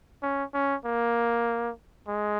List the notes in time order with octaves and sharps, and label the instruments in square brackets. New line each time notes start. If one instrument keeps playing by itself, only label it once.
[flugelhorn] C#4
C#4
A#3
G#3